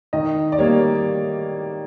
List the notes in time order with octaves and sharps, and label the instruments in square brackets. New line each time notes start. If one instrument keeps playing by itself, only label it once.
[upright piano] D#3 D#5
D5
G3 A#3 C#5